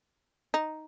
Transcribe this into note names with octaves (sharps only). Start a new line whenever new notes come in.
D#4